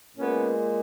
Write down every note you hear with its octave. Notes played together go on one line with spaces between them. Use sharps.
A#2 G#3 B3 C#4